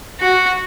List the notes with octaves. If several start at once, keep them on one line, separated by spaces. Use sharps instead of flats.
F#4